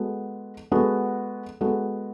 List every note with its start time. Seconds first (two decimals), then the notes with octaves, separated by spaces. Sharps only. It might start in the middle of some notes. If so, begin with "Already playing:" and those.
Already playing: G#3 B3 F#4 A4
0.71 G#3 B3 F#4 A4
1.61 G#3 B3 F#4 A4